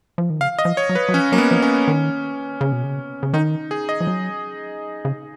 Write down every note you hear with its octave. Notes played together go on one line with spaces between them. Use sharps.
F3
D#3
C#3 F5
D#5
F3
C#5
F#3
B4
F#3
F3 C#4
F#3 A#3
B3
F3
C#4
D#3
C#3
B2
C#3
C#3
D#3 D#4
G#4
D#5
F3
F#3
C#3